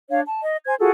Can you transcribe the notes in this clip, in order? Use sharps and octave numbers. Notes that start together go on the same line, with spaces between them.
D4 C#5 F5
A5
D#5
C5 G#5 G#6
F4 F#4 G#4 A4